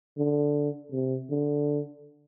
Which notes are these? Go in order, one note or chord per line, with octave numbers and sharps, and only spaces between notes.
D3
C3
D3